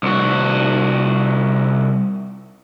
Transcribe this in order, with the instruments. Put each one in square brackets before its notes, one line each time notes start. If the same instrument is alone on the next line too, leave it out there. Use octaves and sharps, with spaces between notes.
[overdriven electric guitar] C2 F#4